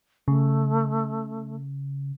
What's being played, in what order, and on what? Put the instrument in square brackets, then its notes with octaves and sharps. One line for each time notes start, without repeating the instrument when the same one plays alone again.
[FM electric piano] C#3 [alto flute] A3